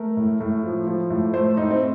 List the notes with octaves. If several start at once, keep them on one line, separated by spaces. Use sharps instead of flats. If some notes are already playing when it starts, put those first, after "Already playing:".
Already playing: A3 A#4
A2
A2
F3
F3
A2
A3 C5
A2 D#4
C4